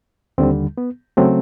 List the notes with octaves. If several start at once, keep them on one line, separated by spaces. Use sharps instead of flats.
D#2 D3 G3 C4
B3
C#3 F#3 A3 C4